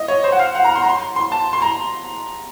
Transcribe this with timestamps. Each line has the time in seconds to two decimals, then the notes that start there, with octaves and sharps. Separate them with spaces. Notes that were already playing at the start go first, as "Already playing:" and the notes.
Already playing: D#5
0.08 C#5
0.24 C5
0.32 F#5
0.39 F5
0.55 F#5
0.64 A#5
0.75 C6
0.82 A#5
0.89 C6
1.16 C6
1.32 A5
1.53 C6
1.62 A#5